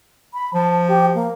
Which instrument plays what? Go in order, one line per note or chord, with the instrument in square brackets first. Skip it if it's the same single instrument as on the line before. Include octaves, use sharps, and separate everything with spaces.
[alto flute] B5
[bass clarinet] F3 [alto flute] A5
[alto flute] G4
A#3